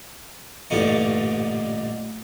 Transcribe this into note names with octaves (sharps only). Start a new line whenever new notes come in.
A1 G2 A#2 D3 D#4 C#6